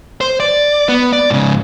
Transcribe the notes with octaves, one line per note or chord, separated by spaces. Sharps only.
C5
D5
B3
D5
G#2 C#3